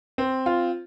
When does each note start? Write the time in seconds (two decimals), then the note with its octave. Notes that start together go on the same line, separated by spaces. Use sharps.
0.18 C4
0.46 F4